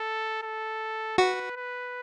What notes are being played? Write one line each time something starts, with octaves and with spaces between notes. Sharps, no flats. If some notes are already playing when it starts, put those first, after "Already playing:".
Already playing: A4
A4
F#4 B4
B4